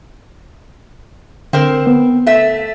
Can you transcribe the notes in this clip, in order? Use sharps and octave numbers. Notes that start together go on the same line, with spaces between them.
D3 C4 A#4 C5
B3
A3 E5